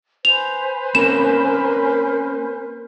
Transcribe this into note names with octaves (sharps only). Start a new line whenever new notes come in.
B4 C5 G#5 F7
A#3 C4 C#4 A#4 E7